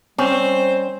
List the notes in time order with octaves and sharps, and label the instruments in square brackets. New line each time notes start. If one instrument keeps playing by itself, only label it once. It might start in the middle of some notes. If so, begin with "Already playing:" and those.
[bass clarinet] G3 [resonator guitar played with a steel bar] C4 [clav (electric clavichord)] C#4 [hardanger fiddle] C5